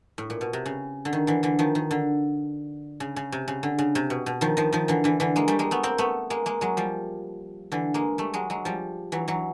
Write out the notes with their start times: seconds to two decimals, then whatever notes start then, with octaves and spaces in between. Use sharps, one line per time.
0.18 A2
0.30 A#2
0.41 B2
0.53 C3
0.66 C#3
1.05 D3
1.13 D#3
1.27 D3 E3
1.43 D3 E3
1.59 D#3 F3
1.75 D#3
1.91 D3
3.00 C#3
3.16 C#3
3.32 C3
3.48 C#3
3.63 D3
3.79 C#3
3.95 C3
4.10 B2
4.26 B2
4.41 D#3 F3
4.57 D#3 F3
4.73 D#3 F3
4.88 D3 E3
5.04 D3 E3
5.20 D3 E3
5.36 G#3 A#3
5.48 G3 A3
5.59 G#3 A#3
5.71 A3 B3
5.83 A#3 C4
5.98 A3 B3
6.30 G#3 A#3
6.46 G#3 A#3
6.61 F#3 G#3
6.77 F3 G3
7.72 D3 E3
7.94 G#3 A#3
8.18 G3 A3
8.34 F#3 G#3
8.50 F#3 G#3
8.65 F3 G3
9.12 E3 F#3
9.28 E3 F#3